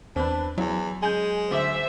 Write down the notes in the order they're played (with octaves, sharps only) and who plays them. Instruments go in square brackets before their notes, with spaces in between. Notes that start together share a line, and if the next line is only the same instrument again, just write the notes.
[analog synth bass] E2 [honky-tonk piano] C4 B4 [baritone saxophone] D4
[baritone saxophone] E2 [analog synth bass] F#3 [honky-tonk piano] E4
[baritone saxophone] G#3 [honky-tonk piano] G#5 G6
[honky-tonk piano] D2 D6 [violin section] C5 E5